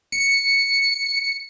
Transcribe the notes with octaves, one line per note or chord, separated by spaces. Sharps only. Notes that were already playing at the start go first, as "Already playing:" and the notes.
C#7